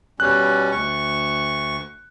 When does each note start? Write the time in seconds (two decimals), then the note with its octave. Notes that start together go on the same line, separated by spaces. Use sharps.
0.20 B2 G3 C#4 F#6
0.72 D2 C#6